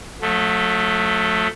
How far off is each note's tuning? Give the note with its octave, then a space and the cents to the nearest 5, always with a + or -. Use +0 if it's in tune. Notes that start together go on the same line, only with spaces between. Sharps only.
F#3 -40 A3 +0